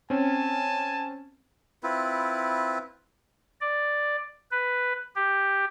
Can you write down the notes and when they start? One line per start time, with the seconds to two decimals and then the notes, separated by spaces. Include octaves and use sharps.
0.10 C4 C#4 G#5 A5
1.83 C4 E4 F4 B4
3.61 D5
4.51 B4
5.15 G4